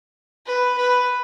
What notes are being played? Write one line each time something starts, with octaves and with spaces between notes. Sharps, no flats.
B4
B4